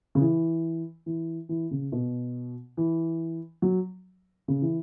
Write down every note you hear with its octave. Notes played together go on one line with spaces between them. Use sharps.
C#3
E3
E3
E3
C#3
B2
E3
F#3
C#3
E3